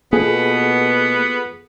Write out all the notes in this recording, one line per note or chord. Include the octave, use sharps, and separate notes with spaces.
B2 A#3 B3 F4 G#4 A4